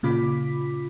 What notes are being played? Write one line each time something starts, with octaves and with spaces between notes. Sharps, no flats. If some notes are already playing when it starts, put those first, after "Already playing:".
A#2 C#3 F4 B5 D6 B6